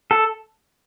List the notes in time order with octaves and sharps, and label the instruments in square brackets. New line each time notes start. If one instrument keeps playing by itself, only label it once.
[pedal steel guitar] A4